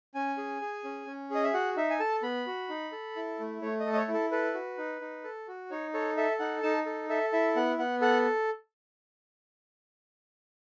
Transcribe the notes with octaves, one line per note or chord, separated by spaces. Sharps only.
C#4 G#5
G#4
G#4
C#4
C#4
G#4 D#5
E5
F#4 F#5
D#4 E5
G#5
A4 A5
B3 B5
F#4
D#4
A4
E4
A3
A3 C#5
D#5
A4
D#5
C#5
E4
A4
A4 B4
F#4
D#4
D#4
A4
F#4
D#4 C#5
A4 C#5
A4 E5
D#4 F#5
D#4 A5
A4
A4 E5
E4 E5
B3 F#5
B3 F#5
A4 F#5